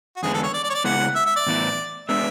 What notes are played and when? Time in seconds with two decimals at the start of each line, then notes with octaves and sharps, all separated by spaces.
0.16 F#4
0.23 E2 D3 G#3 B3 G#4
0.34 A4
0.43 C#5
0.54 D5
0.64 D5
0.70 C#5
0.75 D5
0.84 C#3 G#3 B3 E4 G#4 F#5
1.15 E5
1.26 E5
1.36 D5
1.47 A2 E3 B3 E4
2.08 G#3 B3 D4 E5